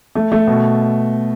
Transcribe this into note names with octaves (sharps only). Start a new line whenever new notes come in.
A3
A3
B2